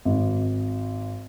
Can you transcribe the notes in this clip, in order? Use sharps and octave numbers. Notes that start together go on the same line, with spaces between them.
G#1